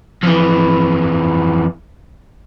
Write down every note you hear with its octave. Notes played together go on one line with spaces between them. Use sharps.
F2 E3